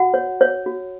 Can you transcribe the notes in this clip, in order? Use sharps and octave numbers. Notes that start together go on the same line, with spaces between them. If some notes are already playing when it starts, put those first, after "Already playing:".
Already playing: F#4 F#5
C#5
C#5
F#4